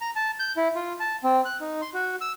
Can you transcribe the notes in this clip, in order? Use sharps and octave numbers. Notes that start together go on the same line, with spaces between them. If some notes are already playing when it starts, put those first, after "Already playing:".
A#5
A5
G6
E4
F4
A5
C4
F#6
D#4
C6
F#4
E6